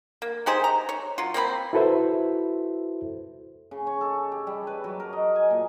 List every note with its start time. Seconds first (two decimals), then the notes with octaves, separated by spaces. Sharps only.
0.22 A#3
0.46 D#4 G4 G#4 C5
0.64 A#5
0.89 C#5
1.18 F#3 F4
1.34 A#3 C4 D5 B5
1.73 E4 F#4 A4 B4 C5 E5
3.71 C#3
3.87 C#5
4.01 A4
4.32 G4
4.47 G3
4.67 B4
4.84 F#3
5.00 A#4
5.13 D#5
5.35 G#5
5.51 A#2